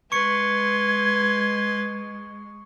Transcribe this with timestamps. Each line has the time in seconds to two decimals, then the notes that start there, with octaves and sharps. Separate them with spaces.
0.12 G#3 B4 C6 C#6 G#6 C#7